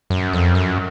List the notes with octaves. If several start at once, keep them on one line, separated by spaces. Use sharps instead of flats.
F#2
F2
F#2